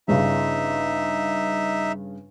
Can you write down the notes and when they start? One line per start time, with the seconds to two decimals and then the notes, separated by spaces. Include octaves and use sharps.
0.08 G1 G2 C#3 D#4 E5